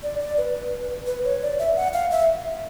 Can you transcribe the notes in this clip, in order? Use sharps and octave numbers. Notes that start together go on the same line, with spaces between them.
D5
D5
B4
B4
C#5
D5
E5
F#5
F5
E5